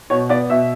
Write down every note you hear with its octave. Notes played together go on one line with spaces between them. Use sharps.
B2 C#5
B3 D5
B2 E5